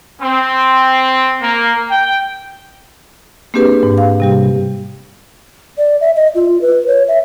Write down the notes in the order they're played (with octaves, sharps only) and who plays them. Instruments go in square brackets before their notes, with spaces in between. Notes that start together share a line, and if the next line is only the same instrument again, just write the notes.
[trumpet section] C4
A#3
G5
[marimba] A#3 C4 D4 G4 G#4 B4
G#2
F5
C3 G3 G4
[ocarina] D5
E5
D#5
F4
B4
C#5
E5